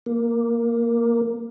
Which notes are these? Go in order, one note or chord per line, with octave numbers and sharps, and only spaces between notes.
A#3